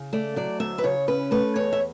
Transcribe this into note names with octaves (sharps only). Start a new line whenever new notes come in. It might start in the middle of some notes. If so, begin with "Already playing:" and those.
Already playing: C#3
A3 D5
F#3 D5
D2 E5
B4
C#3 C#5
C#4 B4
A3 B4
E2 C#5
E5